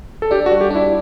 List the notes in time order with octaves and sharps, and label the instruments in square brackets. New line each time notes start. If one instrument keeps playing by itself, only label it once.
[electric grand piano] A4
[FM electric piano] D4 [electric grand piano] G4
[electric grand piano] F#4
[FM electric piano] G3
[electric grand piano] G4
[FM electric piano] D4 [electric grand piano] E4